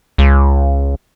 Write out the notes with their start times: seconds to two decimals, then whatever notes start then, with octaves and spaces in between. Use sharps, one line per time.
0.18 C#2